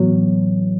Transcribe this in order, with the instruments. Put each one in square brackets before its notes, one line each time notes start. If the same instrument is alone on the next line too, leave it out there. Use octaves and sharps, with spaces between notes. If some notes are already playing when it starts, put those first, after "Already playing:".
Already playing: [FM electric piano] A2 E3 B3 [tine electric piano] F#3